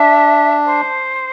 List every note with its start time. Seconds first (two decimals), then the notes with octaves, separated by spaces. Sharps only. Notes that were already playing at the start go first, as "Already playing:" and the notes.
Already playing: D4 E5
0.65 C5